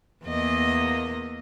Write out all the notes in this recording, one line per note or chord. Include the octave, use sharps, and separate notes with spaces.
E2 A#3 D#5